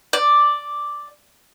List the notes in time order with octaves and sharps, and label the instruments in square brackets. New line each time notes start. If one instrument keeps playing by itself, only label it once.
[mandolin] D5